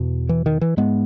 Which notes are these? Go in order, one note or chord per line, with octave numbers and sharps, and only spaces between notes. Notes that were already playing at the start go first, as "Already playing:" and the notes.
Already playing: E2 B2
E3
D#3
E3
G#2 G#3 B3